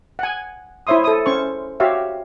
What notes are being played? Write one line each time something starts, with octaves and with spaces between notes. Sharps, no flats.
F#5 G#5
E4 C5 C#5 E5 C6 D#6
A4 D#6
C#4 C5 C#6
F#4 G4 C#5 E5 F5